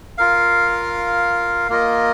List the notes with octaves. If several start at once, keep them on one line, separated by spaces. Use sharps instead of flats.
F4 A#4 F5
A#3 F4 A#4 D#5